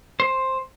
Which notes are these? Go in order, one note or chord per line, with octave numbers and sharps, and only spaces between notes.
C5